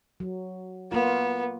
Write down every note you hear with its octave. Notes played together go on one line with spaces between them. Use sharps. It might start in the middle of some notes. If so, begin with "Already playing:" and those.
F#3
A#3 B3 F4